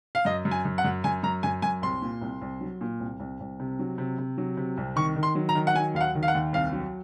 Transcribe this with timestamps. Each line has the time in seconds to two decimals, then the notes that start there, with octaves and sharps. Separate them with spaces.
0.15 F5
0.25 F#2 D#5
0.45 F#2
0.51 G#5
0.65 F#2
0.78 F#5
0.84 F#2
1.04 F#2 G#5
1.23 F#2 A#5
1.43 F#2 G#5
1.62 F#2 G#5
1.82 C2 C6
2.02 A#2
2.21 C2
2.41 C2
2.61 F#3
2.81 A#2
3.00 C2
3.20 C2
3.40 C2
3.60 C3
3.79 F#3
3.98 C3
4.19 C3
4.38 F#3
4.57 C3
4.77 C2
4.96 D#3 C#6
5.16 D#3
5.23 C6
5.35 F#3
5.49 A#5
5.55 D#3
5.67 F#5
5.74 F#3 G#5
5.94 D#2 F5
6.01 F#5
6.15 D#3
6.23 F5
6.28 F#5
6.34 D#2
6.53 C2 F5
6.73 F#3